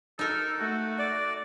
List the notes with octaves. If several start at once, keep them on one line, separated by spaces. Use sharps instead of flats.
D#4 A4 A#4
A3 F#4
D5